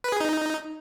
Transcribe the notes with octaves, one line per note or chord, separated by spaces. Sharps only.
B4
G#4
D#4